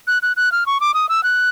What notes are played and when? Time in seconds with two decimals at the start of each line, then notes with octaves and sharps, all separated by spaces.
0.07 F#6
0.22 F#6
0.37 F#6
0.52 F6
0.66 C#6
0.81 D6
0.94 D#6
1.09 E6
1.23 F#6